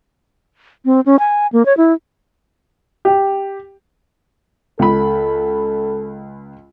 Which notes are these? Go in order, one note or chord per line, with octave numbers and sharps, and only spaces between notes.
C4
C#4
G#5
A#3
C#5
E4
G4
C#2 A4 B5